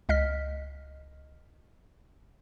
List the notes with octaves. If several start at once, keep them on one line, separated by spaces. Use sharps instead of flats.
C#2 D#5 F6 B6